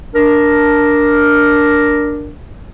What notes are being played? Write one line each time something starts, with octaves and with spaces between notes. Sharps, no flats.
D4 A#4